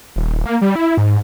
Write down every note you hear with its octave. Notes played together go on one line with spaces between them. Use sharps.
D#1
A#3
G3
E4
G#2